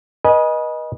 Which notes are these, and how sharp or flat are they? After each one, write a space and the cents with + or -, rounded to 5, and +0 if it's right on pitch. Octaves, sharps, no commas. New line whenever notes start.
B4 -35 D#5 +0 G#5 +10